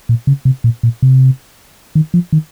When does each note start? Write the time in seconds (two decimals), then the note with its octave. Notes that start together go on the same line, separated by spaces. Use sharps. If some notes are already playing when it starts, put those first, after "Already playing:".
0.09 A#2
0.27 C#3
0.45 C3
0.64 A#2
0.83 A#2
1.02 C3
1.95 D#3
2.14 F3
2.33 D#3